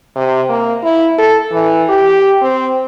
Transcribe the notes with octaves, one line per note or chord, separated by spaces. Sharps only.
C3
A#3
E4
A4
E3
G4
C4